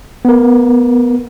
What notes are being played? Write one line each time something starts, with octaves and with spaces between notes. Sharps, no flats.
B3 A#4